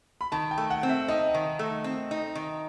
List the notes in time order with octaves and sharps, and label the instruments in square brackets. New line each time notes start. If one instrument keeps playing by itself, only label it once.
[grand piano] B5
[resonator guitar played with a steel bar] D#3 [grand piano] A5
[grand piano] G5
[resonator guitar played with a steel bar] A3
[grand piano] F#5
[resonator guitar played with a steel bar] C4
[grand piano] E5
[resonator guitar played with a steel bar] D#4 [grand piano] D#5
[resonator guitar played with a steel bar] D#3
A3
C4
D#4
D#3